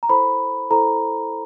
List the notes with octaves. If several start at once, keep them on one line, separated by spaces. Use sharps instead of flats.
A#5
E4 A4 C5 B5
E4 A4 C5 A#5